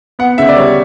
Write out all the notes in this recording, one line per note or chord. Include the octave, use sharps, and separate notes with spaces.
B3 F#5
C#3 E5
D5
G3 C#5